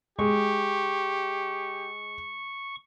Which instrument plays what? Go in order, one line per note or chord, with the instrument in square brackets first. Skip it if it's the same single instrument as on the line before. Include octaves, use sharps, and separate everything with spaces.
[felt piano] G#3 [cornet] G4 [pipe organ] C#6